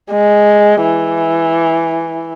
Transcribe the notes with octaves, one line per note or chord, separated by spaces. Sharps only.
G#3
E3